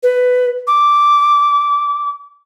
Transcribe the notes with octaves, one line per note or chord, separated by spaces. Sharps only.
B4
D6